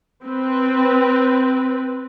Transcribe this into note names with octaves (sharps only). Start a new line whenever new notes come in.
C4 B4